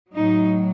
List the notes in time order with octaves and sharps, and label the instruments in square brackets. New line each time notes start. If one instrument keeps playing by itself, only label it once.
[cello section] A2 F#3 D#4